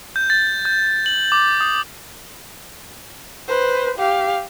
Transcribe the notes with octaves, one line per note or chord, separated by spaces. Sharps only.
G6
A6
G6
F#7
D6
D#6
B4 C5
G4 F5